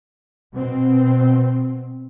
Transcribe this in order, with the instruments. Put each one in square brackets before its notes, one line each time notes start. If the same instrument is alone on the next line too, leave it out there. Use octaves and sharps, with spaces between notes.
[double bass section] B2 C4